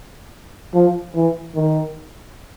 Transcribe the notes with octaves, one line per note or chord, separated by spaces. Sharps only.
F3
E3
D#3